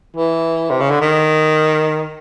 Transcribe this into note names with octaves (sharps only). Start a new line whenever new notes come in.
E3
C3
C#3
D3
D#3